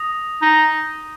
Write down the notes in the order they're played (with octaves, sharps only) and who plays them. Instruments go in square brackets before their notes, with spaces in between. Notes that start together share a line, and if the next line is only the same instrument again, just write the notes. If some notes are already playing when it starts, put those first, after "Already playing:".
Already playing: [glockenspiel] D#6 A#6 F7
[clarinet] D#4